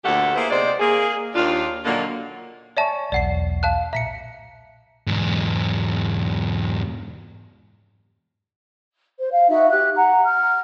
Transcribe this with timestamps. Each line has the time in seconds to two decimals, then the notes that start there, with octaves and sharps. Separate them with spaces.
0.05 D2 A#2 D3 A3 G4 F#5
0.36 A#3 B3 E4 G#4 C5
0.50 C3 G#3 D#4 C5 D5
0.80 A#3 G#4
1.34 D#2 D4 F4
1.85 A#2 D3 D#3 F#3 A#3
2.77 C#5 D5 E5 G#5 A5 C#6
3.12 B1 E2 D5 F#5 C7
3.63 F5 A5 F#6
3.93 A#2 E5 A#5 B6 C#7
5.07 E2 G#2
9.20 C5
9.32 F5
9.49 D#4 F#4 E5
9.70 G4 F#6
9.96 F#5 A#5
10.25 F6